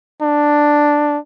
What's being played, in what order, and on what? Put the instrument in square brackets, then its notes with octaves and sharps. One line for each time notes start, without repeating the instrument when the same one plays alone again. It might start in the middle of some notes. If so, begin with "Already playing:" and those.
[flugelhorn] D4